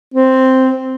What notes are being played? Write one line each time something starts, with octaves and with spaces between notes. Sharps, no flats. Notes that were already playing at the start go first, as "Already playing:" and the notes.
C4